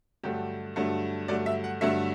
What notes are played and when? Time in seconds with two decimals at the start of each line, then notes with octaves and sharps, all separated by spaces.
0.24 G2 D3 F#3 A3 G4
0.76 G2 D3 F#3 A3
1.28 G2 D3 F#3 A3 D5
1.46 E5
1.64 F#5
1.81 G2 D3 F#3 A3 E5